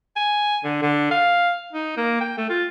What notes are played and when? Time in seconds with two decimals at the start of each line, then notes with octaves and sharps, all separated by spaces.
0.16 G#5
0.64 D3
0.82 D3
1.11 F5
1.73 D#4
1.97 A#3
2.21 G5
2.38 A3
2.50 F4